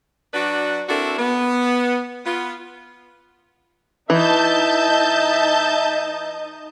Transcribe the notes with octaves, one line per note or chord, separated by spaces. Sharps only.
F#3 D4 F#4 B4 D5
C4 D4 E4 F#4 A4 A#4
B3
B3 F4
E3 D#4 D#5 E5 A5 G6